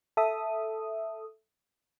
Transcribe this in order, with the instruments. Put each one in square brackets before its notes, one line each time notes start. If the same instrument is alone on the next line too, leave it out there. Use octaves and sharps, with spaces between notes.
[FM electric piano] A4 E5 D#6